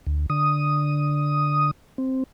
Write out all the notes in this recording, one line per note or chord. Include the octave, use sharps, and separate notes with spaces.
D2
D3 D#6
C4